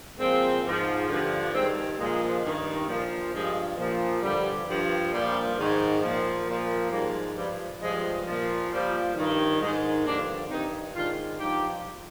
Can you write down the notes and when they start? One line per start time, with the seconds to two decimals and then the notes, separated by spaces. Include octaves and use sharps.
0.18 A#2 F3 G#3 C4
0.64 G#2 F3
1.09 G2 D3 F3
1.53 G2 D#3 G#3 C4
1.98 A#2 F3 G#3
2.43 G2 D#3
2.87 A#2 F3
3.33 G2 F3 G#3
3.77 A#2 F3
4.22 G2 D3 F3 G3
4.66 G2 F3
5.11 A#2 F3 G3
5.56 G#2 D#3
6.01 A#2 F3
6.47 A#2 F3
6.91 G#2 F3 G3 A#3
7.35 G2 F3 G3
7.80 G2 F3 G#3
8.25 A#2 F3
8.70 A#2 F3 G3
9.16 G2 D#3
9.60 G#2 D#3 G#3
10.05 G2 D3 F3 A#3 D4
10.49 G2 D#3 C4 D#4
10.94 G#2 D#3 D4 F4
11.39 G2 F3 D#4 G4